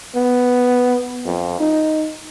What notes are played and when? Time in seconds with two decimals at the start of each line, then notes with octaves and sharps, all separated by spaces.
0.16 B3
1.26 F2
1.60 D#4